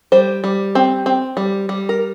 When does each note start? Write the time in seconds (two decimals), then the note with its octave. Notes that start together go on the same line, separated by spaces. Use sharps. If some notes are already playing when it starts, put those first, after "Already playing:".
0.12 G3 C5
0.44 G3
0.75 C4
1.06 C4
1.37 G3
1.69 G3
1.89 A#4